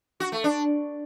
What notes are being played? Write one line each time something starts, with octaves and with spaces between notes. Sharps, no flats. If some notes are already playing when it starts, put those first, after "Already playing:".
F#4
A3
D4